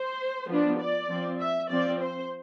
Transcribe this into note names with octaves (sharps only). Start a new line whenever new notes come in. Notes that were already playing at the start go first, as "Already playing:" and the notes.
Already playing: C5
F3 B3 D4
D5
F3 C4
E5
F3 C4 D5
C5